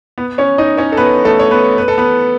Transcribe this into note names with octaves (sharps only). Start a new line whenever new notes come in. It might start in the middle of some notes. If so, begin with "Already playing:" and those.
B3 B4
C#4 C#5
D#4 D#5
C#4 C#5
A4
B3 B4
A3 A4
C#5
B3 B4
B4
A4
B3 B4